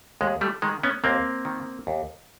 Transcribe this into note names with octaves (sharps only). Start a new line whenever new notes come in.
D#2 G#3
G3 A3
D#3 G#3
B3 C#4
D#2 A#3 C4
D#3
D#2